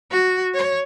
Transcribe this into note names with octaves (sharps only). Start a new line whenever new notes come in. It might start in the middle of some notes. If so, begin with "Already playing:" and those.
F#4
C#5